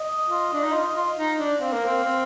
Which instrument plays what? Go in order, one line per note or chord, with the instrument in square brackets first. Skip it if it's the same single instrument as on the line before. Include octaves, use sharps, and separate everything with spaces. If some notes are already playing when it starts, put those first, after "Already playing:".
Already playing: [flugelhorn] D#5
[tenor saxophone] F4
D4
D#4
F4
F4
D#4
D4
[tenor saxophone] C4 [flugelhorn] F5
[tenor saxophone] A#3
C4
C4